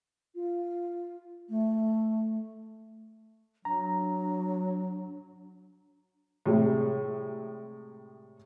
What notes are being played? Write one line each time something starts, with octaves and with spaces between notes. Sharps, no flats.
F4
A3
F#3 D4 A#5
A2 C3 G3 G#3